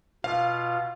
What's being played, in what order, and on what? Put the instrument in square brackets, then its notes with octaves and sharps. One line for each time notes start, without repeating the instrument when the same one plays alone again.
[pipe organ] B2 F4 [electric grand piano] F5